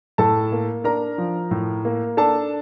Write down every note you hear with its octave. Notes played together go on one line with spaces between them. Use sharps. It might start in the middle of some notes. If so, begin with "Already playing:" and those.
A2 A4 A5
A#3
D4 A#4 A#5
F3
A2
A#3
D4 A4 A5